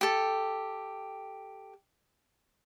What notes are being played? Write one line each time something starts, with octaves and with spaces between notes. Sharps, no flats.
G4 A4